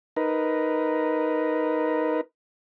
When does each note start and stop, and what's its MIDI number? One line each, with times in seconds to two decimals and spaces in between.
0.16 2.21 63
0.16 2.21 70
0.16 2.21 71